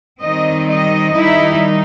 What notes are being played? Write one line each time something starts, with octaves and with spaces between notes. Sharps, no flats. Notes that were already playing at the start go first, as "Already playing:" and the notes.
D#3 G3 C4 D#4 D#5
D#5
D#3 G3 D#4 E4